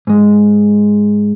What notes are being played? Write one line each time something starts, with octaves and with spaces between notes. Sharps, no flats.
G#2 G#3